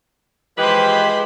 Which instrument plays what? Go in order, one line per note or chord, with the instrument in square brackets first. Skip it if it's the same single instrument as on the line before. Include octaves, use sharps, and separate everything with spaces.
[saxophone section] E3 B4 [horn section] F3 G#3 [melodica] G4 [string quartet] C5 B5 C6